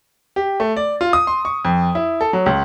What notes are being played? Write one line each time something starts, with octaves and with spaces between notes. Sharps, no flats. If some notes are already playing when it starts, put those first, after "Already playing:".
G4
A3
D5
F4
D#6
C6
C#6
F2
E4
A4
F#3
C#2